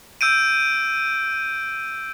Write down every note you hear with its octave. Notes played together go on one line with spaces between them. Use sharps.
E6 G6 D7 D#7